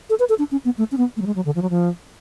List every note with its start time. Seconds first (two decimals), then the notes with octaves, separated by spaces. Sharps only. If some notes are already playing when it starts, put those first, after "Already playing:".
0.10 A4
0.19 B4
0.29 A4
0.39 D4
0.52 C#4
0.65 B3
0.78 A3
0.92 C#4
0.97 B3
1.17 A3
1.21 F#3
1.26 G#3
1.36 F#3
1.45 D3
1.55 F3
1.62 F#3
1.70 F3